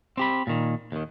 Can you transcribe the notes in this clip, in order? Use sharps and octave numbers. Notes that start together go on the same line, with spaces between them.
C4 G4 B5
A#2 D#3
D#2 D#3